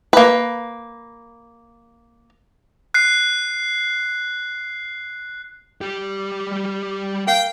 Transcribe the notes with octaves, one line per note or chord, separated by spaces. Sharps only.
A#3 B4
F#6 C7
G3 G4
A#4 F5 G5